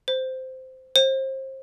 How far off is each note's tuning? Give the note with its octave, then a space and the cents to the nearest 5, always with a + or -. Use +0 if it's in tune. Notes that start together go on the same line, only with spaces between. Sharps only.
C5 -10
C5 +30